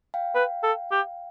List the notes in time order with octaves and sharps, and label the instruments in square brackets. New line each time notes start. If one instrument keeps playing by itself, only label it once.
[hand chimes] F5 G5
[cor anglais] B4
A4
G4